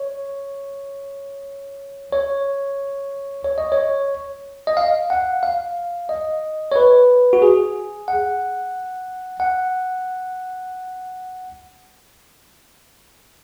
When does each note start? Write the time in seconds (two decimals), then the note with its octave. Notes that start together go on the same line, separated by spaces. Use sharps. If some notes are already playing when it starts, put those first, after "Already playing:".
Already playing: C#5
2.12 C#5
3.44 C#5
3.58 D#5
3.72 C#5
4.67 D#5
4.77 F5
5.10 F#5
5.43 F5
6.09 D#5
6.72 C#5
6.76 B4
7.33 F#4
7.42 G#4
8.08 F#5
9.40 F#5